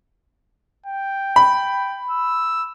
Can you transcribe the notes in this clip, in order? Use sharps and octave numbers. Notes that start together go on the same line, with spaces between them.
G5
B5
E6